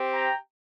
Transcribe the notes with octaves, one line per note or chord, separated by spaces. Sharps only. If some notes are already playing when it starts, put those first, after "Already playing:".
Already playing: C4 G4
G5 A#5